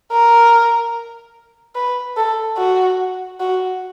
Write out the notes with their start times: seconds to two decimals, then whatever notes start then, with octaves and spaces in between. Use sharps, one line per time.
0.12 A#4
1.75 B4
2.17 A4
2.57 F#4
3.40 F#4